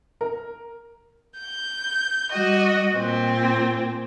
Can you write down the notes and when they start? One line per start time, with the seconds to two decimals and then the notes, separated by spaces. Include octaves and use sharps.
0.21 A#4
1.38 G6
2.31 G3 F#4 D#5
2.95 A#2 C4